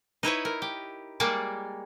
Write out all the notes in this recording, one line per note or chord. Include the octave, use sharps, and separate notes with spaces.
D#4 E4 B4 C#5
A#4
G4
G3 G#3 A#3 C#5 D5